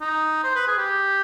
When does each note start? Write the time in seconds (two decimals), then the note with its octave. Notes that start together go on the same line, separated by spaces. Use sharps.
0.01 D#4
0.44 C5
0.56 B4
0.67 G#4
0.78 G4